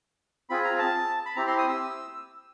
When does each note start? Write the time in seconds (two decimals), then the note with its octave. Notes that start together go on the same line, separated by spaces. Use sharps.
0.50 C4 F4 G#4 B5
0.64 A#5
0.79 A5
1.26 B5
1.36 C4 E4 G4 A#5
1.47 C6
1.58 D#6
1.69 E6